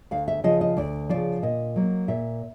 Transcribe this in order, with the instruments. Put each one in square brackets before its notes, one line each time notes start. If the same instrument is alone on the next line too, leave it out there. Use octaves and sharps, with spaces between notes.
[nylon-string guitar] D2 F5
E5
C#3 F3 D#5
D#5
D2 D5
C#3 F3 D5
A#2 D#5
F#3 A#3
A#2 E5